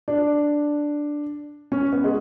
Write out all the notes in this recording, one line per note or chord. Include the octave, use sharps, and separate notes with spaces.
D4
C#4
B3
G#3